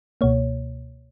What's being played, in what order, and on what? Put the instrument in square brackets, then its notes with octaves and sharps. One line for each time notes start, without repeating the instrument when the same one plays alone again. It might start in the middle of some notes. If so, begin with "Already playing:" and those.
[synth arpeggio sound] C#2 B2 A#3 C#5